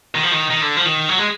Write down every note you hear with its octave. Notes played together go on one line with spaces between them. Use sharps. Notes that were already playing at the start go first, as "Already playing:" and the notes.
D#3
F3
D#3
D#3
D3
F3
D#3
F#3
G#3